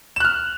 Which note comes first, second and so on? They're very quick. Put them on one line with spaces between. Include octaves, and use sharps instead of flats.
E7 F#6 F6